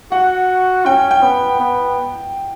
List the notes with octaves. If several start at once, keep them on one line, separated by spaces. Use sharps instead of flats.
F#4 F#5
C#4 G5
G5
B3
B3